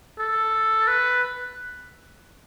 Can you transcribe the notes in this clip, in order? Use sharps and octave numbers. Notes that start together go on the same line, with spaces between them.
A4
B4